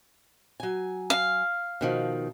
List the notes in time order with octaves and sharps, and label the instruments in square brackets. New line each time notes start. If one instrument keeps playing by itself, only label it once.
[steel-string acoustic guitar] F#3 G#5
[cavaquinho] F5
[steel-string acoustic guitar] B2 D#3 F3